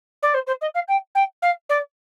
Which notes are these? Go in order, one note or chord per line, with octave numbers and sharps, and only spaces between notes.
D5
C5
C5
D#5
F5
G5
G5
F5
D5